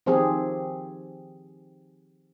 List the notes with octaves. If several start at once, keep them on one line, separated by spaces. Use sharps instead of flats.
D#3 F3 C4 G4 G#4